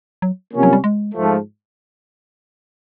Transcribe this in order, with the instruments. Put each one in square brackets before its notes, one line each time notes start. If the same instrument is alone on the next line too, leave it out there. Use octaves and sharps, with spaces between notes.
[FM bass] F#3
[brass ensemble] C3 F3 A#3 C#4
[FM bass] F#3
G3
G#3
[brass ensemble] G#2 F3 A3